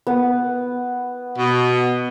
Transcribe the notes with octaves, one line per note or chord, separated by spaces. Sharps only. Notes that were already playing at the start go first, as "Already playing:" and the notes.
B3
B2